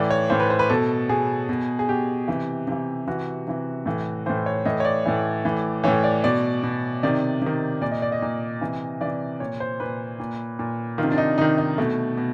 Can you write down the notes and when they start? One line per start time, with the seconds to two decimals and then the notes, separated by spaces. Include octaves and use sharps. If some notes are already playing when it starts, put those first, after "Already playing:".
Already playing: A2 E3 D5
0.10 C#5
0.30 A2 E3 C5
0.40 B4
0.50 C5
0.59 B4
0.70 B2 A4
1.09 B2 G#4
1.49 B2
1.79 G#4
1.89 B2 G4
2.28 C3 E3
2.67 C3 E3
3.07 C3 E3 F#4
3.47 C3 E3
3.86 A2 E3
4.26 A2 E3 C5
4.46 C#5
4.65 A2 E3 D#5
4.80 C#5
4.85 D5
5.06 A2 E3
5.45 A2 E3
5.84 A2 E3 C#5
6.04 D5
6.24 B2 D5
6.63 B2
7.03 C3 D#3 D5
7.42 C3 D#3
7.81 A#2 D5
7.92 D#5
8.02 D5
8.12 D#5
8.22 A#2
8.61 C3 E3
9.01 C3 E3 D5
9.40 A#2 C#5
9.60 C5
9.80 A#2 B4
10.20 A#2
10.59 A#2
10.98 D#3 F4
11.03 C3
11.12 D4
11.18 D#4
11.38 C3 D#3 D#4
11.58 D#4
11.78 B2 A3
12.17 B2